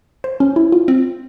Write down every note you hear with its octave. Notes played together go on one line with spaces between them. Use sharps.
C5
C#4
E4
F4
C4